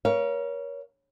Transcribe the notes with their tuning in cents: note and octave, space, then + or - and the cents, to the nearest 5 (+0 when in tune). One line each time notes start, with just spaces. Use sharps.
A#4 +35 C#5 +20 F5 -20